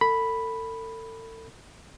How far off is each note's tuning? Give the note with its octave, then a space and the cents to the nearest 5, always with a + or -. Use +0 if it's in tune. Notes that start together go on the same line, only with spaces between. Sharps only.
A4 +35 B5 +0